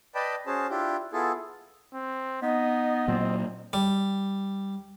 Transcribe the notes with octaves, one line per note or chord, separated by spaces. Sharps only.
B4 D5 D#5 G5 A5 B5
C#4 F#4 G#4 C5 A5
D4 E4 F4 G4
B3 E4 F4 G#4 A4
C4
B3 D#4 D#5
A#2 F#3 C4
G3